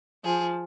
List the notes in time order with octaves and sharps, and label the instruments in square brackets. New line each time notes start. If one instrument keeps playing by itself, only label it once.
[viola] F3 [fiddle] G#4